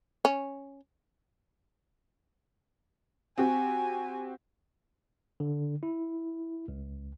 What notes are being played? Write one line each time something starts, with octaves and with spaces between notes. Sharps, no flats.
C#4
C4 F#4 G4 G#5
D3
E4
C#2